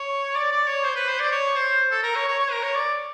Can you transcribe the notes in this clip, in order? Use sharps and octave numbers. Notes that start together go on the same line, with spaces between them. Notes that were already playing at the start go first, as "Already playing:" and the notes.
Already playing: C#5
D5
D5
C#5
C5
B4
C5
D5
C#5
C5
A4
A#4
C#5
C#5
C#5
A#4
C#5
D5